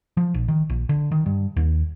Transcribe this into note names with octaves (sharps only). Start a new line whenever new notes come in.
F3
A#1
D#3
A#1
D3
D#3
G2
D#2